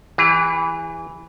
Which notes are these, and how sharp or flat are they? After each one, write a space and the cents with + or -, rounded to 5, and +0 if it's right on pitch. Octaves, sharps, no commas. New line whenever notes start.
E3 +0 G4 +45